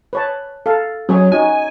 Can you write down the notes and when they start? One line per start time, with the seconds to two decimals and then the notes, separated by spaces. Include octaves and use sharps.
0.13 B4 C#5 A5
0.66 A4 F5
1.09 F#3 C#4 G#4 C#5
1.32 D#4 F#4 G#5